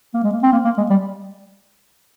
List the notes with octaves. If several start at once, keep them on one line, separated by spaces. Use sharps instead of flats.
A#3
G#3
A#3
C4
A#3
A#3
G#3
G3